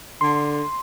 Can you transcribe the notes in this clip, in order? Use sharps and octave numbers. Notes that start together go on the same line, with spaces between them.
D3 C6